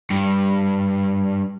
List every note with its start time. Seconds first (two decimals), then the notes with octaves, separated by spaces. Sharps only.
0.10 G2